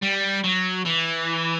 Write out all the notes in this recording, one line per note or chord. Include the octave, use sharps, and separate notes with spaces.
G3
F#3
E3